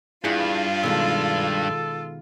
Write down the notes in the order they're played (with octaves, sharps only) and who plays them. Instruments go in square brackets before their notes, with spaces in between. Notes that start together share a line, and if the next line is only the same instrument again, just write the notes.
[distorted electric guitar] G2 [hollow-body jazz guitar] E4 G#4 F#5 [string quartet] F4
[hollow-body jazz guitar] B2 D#3 G#3 [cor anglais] A4